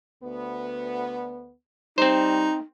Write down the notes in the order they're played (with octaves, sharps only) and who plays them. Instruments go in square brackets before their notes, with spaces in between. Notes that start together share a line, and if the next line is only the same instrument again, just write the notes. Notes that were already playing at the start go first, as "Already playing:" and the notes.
[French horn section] D2 B3
[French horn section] G3 [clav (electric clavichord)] C4 C5 [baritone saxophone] D#4